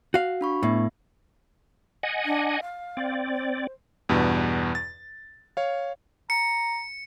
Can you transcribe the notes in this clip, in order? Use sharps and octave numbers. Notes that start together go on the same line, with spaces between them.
F#4 F5
D4 B5 C#6
A2 B3 E5
D#5 F#5 G#5
D4
F5
C4 D5
C5
E2 G2 B2
A6
C#5 F5
A#5 C#7